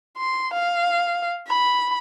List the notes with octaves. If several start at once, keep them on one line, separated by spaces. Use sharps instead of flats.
C6
F5
B5